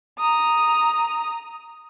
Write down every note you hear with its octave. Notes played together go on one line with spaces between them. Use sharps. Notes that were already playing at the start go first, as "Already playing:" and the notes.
A#5 D#6